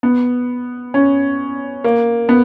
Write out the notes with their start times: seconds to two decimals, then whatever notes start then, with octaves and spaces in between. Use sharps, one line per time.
0.03 B3
0.94 C#4
1.84 A#3
2.29 B3